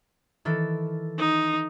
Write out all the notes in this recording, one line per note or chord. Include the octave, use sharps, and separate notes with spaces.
D#3 E3 A4
D#4